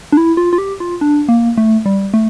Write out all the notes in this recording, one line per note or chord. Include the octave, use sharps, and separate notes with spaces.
D4
E4
F4
F4
G4
F4
D4
A#3
A3
G3
A3